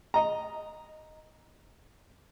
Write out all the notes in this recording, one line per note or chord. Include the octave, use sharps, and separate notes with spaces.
D#5 A#5